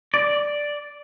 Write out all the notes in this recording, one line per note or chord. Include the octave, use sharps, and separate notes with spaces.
D5